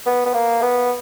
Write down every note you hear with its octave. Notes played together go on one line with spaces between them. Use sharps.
B3
B3
A#3
B3